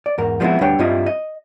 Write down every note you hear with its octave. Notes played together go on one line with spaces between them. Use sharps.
D5
E2 G#2 A#4
F3 G3 G#3 B3 C4 E4
D2 G3 D4 B4 C#5 G5
G2 G3 C4 E4 F4 D#5
D#5